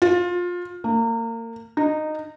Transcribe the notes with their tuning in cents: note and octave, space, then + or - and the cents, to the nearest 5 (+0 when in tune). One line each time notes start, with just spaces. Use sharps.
F4 +20
A#3 -30
D#4 -15